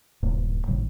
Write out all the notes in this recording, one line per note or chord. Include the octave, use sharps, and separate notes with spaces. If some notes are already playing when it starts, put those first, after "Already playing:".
D1 G2 A#2
G#1 A2 C#3 G3